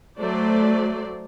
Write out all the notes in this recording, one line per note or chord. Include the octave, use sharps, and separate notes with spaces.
F#3 A3 C5 D5